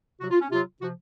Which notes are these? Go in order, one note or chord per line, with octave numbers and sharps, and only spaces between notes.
C3 F#3 F#4
F4
C#4
C3 F#3 F4
C3 F3 F#4